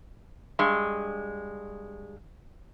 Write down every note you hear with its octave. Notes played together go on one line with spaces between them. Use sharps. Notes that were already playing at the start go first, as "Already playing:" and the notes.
G2 G#3